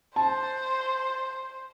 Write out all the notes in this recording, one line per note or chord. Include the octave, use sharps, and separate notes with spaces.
C5 A5